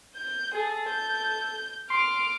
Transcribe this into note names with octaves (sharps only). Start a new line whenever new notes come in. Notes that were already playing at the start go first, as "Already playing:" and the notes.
G6
G#4 A4
G6
C6 D6 F6